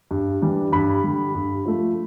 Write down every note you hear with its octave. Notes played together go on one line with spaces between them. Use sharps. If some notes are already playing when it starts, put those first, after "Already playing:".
G2
E3 G3 D4
G2 B5
D3 G3
G2
F3 A3